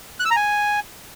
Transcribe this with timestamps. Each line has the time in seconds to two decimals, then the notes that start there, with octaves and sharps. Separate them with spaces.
0.20 F#6
0.25 E6
0.31 A#5
0.36 G#5